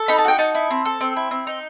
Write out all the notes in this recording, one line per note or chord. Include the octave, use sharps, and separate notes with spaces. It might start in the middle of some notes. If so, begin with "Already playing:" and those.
Already playing: A4
D#4 B5
A5
F#4 G5
D#4 A5
E4
C4
A4
C4
E4
C4
D#4